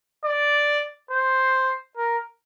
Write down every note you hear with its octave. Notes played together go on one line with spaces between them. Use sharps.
D5
C5
A#4